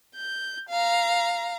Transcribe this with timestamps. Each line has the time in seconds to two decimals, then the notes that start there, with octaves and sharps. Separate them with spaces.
0.16 G6
0.69 F5 A#5